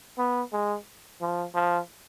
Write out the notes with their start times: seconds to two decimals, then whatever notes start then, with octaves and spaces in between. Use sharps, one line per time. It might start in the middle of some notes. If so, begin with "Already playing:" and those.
0.18 B3
0.53 G#3
1.21 F3
1.55 F3